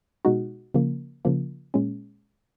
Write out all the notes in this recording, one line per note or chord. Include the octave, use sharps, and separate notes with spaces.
B2 G#3 D#4 F#4
C#3 F3 A#3
C#3 F3 A#3
A#2 G#3 C#4